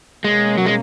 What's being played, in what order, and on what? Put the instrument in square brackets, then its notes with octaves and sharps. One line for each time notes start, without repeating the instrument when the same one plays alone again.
[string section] B2 A#3 C#4 [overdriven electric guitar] G#3
[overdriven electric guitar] F#3
G#3